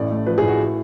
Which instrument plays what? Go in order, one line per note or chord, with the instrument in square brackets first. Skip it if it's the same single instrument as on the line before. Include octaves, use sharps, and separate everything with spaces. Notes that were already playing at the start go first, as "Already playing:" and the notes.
Already playing: [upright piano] A1 A2 D5
A3
F3 B4
A2 G#4
F#4